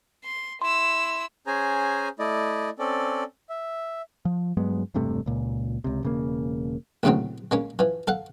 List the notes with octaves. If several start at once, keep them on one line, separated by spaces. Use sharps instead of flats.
C6
E4 C6 E6
C#4 G#4 C5 G#5 A#5
A3 E4 D5 D#5
C4 C#4 A4 D5
E5
F3
G2 F#3 G#3 B3
E1 G2 C3 A3
C#2 A#2
C#2 C3
E1 C#3 A#3
A#1 D#2 A2 C#3 F#3 C4
G#3 A#3 C#4
E3 F3
A4 F5 F#5